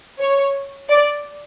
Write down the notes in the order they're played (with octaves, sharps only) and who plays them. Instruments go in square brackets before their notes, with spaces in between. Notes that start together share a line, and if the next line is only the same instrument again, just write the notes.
[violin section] C#5
D5